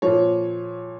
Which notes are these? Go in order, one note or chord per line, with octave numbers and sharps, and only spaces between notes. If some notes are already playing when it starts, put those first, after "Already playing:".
A#2 F3 C#5